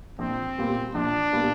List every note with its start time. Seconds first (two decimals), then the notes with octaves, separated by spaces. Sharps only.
0.19 A#1 C4
0.58 A#2 G3 B3
0.95 A#1 D4
1.33 A#2 G3 B3